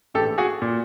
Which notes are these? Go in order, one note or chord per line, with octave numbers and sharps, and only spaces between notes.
A#1 A2 E3 G4 A4
F#4 G#4
A#2